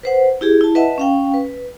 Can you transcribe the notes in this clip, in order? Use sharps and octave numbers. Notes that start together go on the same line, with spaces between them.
B4 C5 F#5
E4 G4 G#4
E4 A5
B4 D#5 E5 F#5 A5
C#4 F5 G5
B4